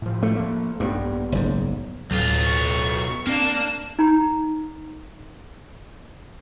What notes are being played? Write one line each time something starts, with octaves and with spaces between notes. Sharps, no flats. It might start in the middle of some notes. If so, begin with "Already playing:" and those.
A2 F3
A3
F3 A#3
A#1 G2 B3
F#1 G#2
D1 B1 F#3 F4
C#6
A#3 C4 D4 E7
D#4 A#5